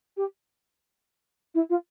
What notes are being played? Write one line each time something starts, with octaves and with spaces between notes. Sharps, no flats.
G4
E4
F4